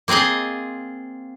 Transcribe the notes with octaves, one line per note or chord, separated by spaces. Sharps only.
A#3 C4 F4 G#4 D#5